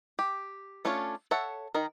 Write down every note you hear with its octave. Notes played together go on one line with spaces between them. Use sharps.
G4
A3 C#4 D4 F4 C#5
A4 C#5 E5 F#5
D#3 D#4 A#4